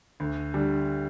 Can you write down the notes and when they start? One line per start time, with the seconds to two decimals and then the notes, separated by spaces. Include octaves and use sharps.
0.20 D2
0.54 D3 G3